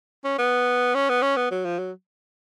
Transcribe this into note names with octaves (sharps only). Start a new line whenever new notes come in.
C#4
B3
C#4
B3
C#4
B3
F#3
F3
F#3